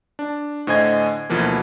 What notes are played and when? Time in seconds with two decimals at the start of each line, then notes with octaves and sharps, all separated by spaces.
0.19 D4
0.67 A2 D3 C5 D#5 G#5 G#6
1.30 D2 B2 E3 F3 A#3